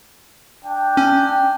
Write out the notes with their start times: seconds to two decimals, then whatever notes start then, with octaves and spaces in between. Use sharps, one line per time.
0.64 D4 G5
0.97 C#4